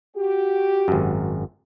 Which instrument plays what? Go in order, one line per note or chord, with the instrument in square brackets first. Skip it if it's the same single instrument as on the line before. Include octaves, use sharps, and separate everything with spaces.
[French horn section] F#4 G4
[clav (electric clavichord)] G#1 F#2